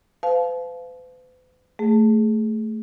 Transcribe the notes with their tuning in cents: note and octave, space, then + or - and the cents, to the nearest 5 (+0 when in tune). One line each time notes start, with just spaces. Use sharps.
B4 +45 F5 +0 A5 -35
A3 +0 G#4 +5